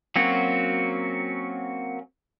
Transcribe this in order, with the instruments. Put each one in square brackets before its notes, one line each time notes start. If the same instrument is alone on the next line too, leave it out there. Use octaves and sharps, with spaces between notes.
[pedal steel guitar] F#3 A#3 C4 C#4 F#4